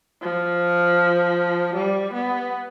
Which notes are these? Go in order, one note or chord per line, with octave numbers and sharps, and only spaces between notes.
F3
G3
B3